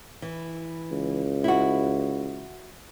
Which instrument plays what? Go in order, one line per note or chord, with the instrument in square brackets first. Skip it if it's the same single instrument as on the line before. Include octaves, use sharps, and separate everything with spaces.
[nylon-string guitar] E3
[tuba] C#2
[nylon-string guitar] E4 F#4